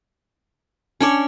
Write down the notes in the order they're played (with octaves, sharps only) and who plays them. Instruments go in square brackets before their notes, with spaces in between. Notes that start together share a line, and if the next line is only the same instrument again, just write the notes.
[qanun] C#4 D4 C#5 [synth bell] G#5 A5 D6